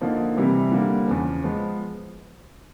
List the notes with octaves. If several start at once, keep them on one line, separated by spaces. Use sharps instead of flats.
D3 F3 A#3 D#4
C3 E3 G3 C4 E4
D3 G3 A#3
E2 C#3 F3
F3 G#3 B3